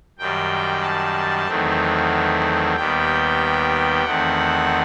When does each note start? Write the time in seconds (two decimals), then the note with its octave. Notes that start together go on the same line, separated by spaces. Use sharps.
0.19 F#2 D#3 G3 G5
0.83 A5
1.47 E2 D#3 F#3 A3 C4
2.76 D#2 D#3 G3 B3 G5
4.04 E2 D#3 A3 C4 F#5